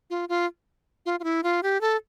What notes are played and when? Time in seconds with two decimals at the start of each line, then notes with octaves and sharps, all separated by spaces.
0.10 F4
0.29 F4
1.06 F4
1.20 F4
1.24 E4
1.43 F4
1.63 G4
1.81 A4